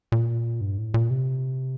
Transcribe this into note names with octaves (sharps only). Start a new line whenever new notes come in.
A#2
G2
A2
A#2
C3